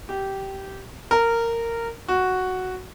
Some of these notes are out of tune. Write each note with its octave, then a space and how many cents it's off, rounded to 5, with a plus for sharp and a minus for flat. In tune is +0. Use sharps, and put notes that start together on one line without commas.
G4 -15
A#4 -15
F#4 +0